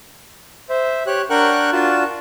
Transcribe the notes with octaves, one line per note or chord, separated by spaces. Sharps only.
C5 E5
G4 C#5 F#6
D4 A#4 F#5 G5 C#6 F#6
D4 F4 F#4 A5